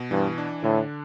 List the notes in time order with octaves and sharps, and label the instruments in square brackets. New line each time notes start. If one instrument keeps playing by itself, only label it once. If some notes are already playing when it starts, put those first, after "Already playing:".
Already playing: [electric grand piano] B2
[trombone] G2 [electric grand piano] E3
[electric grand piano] D4
[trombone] A2 [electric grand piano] D3